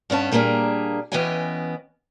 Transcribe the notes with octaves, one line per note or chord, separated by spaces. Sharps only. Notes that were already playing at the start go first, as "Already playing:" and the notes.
G2 B3 C#4 A5
A#2 G3 A#3 D4 G#4
E3 B3 C#4 D#5 G5 G#5